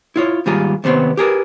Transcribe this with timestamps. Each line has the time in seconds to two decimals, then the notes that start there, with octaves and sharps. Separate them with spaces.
0.16 E4 F4 C#5
0.46 D#2 G#2 G3 F4 G#4 A#5
0.84 D#2 C3 B3 C5 C#5
1.17 G4 G#4 A#4 B4